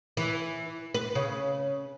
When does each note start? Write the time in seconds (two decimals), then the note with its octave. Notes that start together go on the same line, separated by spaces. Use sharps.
0.17 E3
0.94 B4
1.15 C#3